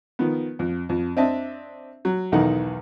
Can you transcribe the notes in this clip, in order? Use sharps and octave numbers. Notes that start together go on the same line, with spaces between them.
D#3 F3 B3
F2
F2
C4 D4 D#5 E5 A5
F#3
B1 E2 D#3 D#4 A4 F#5